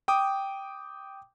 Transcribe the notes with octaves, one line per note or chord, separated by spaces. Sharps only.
G5 D6 D#6